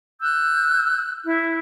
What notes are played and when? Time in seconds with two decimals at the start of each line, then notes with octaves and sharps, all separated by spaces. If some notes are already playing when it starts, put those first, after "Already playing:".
0.21 E6 F#6 G6
1.25 E4